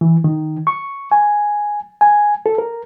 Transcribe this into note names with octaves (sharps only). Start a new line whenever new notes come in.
E3
D#3
C#6
G#5
G#5
A4
A#4